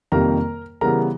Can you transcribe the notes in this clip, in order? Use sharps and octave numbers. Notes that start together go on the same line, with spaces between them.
F2 C3 D#3 G3 A#3 A#4 A#5
C#3 E3 G3 B3 A#4 A#5